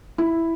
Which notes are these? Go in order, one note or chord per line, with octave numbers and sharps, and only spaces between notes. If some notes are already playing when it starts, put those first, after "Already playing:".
E4